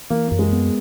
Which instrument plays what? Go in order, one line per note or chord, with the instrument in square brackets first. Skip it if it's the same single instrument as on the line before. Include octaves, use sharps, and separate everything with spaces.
[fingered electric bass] E3 [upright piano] A#3
[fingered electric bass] F#2 [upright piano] A#3
[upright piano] G#3
[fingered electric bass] B3